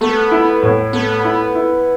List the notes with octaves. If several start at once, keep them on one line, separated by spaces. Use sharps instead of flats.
A3 B3
E4
A2
A3 B3
E4
E4